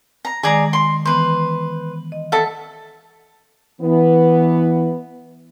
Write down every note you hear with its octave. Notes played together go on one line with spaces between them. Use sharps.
A#5
D#3 G#3 G#4 D5 A#5
C6
E3 B3 B4 C5
D#5
A4 E5 F#5
E3 B3